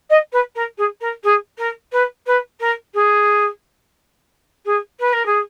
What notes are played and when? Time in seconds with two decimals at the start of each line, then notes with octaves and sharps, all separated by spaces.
0.10 D#5
0.32 B4
0.55 A#4
0.77 G#4
1.00 A#4
1.23 G#4
1.58 A#4
1.92 B4
2.26 B4
2.60 A#4
2.94 G#4
4.65 G#4
4.99 B4
5.13 A#4
5.25 G#4